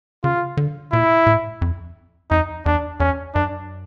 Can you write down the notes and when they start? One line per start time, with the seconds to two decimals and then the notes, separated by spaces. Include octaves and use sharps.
0.24 C#3 F4
0.57 D3
0.92 A#2 E4
1.27 A2
1.62 F2
2.31 F2 D#4
2.66 E2 D4
3.00 E2 C#4
3.35 F#2 D4